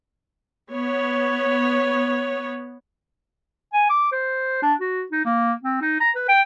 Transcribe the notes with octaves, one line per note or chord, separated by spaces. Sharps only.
B3 C#5
G#5
D6
C5
D4
F#4
D#4
A#3
C4
D#4
A#5
B4
G5